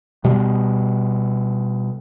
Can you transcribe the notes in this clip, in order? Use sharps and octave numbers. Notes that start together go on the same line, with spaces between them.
B2 G3